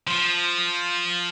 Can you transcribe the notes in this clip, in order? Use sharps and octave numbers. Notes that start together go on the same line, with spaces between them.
F3